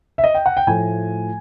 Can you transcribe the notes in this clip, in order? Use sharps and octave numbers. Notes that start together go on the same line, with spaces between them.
E5
D#5
G5
F#5
G5
A2 F3 A3 G#5